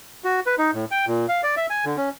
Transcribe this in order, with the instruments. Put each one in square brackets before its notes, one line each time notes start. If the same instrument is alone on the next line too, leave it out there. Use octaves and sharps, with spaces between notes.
[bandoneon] F#4
B4
D#4
A2
G5
A#2
F5
D5
E5
G#5
D3
C#4